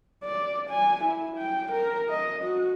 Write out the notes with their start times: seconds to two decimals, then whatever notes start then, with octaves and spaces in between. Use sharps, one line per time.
0.24 D5
0.70 G#5
1.04 E4
1.37 G5
1.72 A#4
2.10 D#5
2.44 F#4